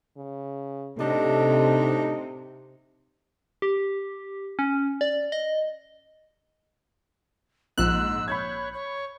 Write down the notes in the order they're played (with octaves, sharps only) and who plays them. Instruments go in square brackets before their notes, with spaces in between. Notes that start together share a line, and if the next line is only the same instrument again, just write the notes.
[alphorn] C#3
[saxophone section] A2 D4 D#4 [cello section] C3 [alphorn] A4
[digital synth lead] G4
C#4
D5
D#5
[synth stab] A#1 F#6 [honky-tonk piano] G#2 [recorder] E6
[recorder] C#5 [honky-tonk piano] B5 G6 G#6
[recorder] C#5